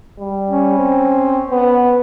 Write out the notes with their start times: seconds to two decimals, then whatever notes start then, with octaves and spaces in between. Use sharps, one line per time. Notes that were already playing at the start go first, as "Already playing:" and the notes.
0.19 G3
0.50 C#4
0.78 C4
1.51 B3